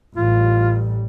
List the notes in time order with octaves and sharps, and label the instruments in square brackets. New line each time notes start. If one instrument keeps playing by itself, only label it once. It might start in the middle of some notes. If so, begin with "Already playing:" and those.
[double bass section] A1 G3 [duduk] F4